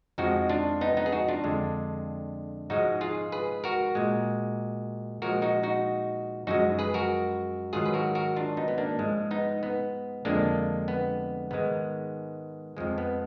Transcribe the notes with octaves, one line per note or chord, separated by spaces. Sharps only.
F2 F3 G#3 D#4 F#4
D4 F4
B3 D#4
B3 D#4
G#4
D#4 F#4
D4 F4
F2 D3 G#3
G#2 F3 G#3 D#4 F#4
F4 G#4
G#4 B4
F#4 A#4
A#2 G#3
A#2 F3 G#3 F#4 A#4
D#4 F#4
D#4 F#4
F#2 F3 G#3 D#4 F#4
G#4 B4
F#4 A#4
G#2 D#3 F#3 F4 G#4
B4
F#4 A#4
F#4 A#4
D4 F4
B3 D#4
B3
A#3 D4
G#2 F3 G#3
B3 D#4
B3
F2 D3 F3 G#3 A#3 D4
B3
G#2 D#3 G#3 B3
F2 F3 G#3
B3